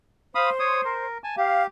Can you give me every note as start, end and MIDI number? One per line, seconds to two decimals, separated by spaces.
0.35 1.06 72
0.35 0.50 77
0.35 0.50 83
0.35 0.50 87
0.60 0.81 73
0.60 0.81 87
0.85 1.18 70
1.24 1.35 80
1.24 1.35 81
1.37 1.67 67
1.37 1.63 77